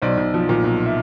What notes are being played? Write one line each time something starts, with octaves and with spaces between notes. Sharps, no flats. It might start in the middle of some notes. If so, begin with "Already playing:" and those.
B1 C5 D5
B1
F3
A#2
B1
E5